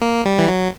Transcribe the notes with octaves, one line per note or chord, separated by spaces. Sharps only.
A#3
G3
E3
F#3